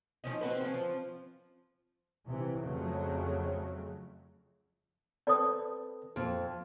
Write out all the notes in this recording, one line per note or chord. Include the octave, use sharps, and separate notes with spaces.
F3 C#4 D#4
C4 F#4 B4
F3 C#4
F3
C3 E3
F2 C#3 F#3 A3
C4 A4 B4 D5 D#6
F2 A#2